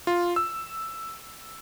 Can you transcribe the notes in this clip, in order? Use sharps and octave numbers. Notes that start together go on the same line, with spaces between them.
F4
E6